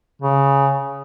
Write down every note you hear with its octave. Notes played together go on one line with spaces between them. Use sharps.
C#3